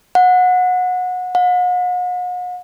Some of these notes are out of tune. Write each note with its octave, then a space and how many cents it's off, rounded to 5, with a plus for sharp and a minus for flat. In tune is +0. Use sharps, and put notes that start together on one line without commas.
F#5 -25
F#5 -45